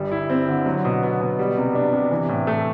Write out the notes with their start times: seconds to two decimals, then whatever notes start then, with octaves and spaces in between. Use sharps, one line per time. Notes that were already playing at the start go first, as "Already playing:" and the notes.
Already playing: G1 G3
0.11 E4
0.30 C4
0.48 D3
0.66 F#3
0.84 B2
1.03 B3
1.20 B2
1.39 G3
1.57 C3
1.75 D4
1.93 C3
2.11 E3
2.29 A2
2.47 A3